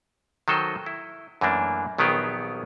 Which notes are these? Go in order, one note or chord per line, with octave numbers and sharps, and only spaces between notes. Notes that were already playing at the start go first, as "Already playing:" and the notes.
D#3 F#3 A4 C5 D#5
E4
F#2 E3 A3 A#3 D4
A#1 D#3 F#3 B3 G4 G#4